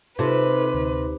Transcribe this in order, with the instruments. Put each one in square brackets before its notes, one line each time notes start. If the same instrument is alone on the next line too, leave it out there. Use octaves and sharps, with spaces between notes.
[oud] C3 [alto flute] D#4 [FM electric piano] F4 A4 C5 [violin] B4
[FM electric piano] D2